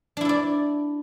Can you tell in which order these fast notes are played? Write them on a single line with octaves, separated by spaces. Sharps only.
D4 E4 A4 D5